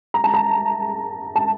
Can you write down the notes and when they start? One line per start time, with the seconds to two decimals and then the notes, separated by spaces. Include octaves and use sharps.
0.14 A#5
0.24 A5
0.34 A#5
1.36 A5